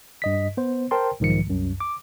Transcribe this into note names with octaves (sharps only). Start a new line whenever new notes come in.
G2 D#5 B6
B3 C5
A#4 C5 G5 A5 C6
B1 G#2 D#3 F3 C#7
C2 F#2
D6